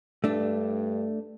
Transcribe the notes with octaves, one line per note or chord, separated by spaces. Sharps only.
G2 A3 D4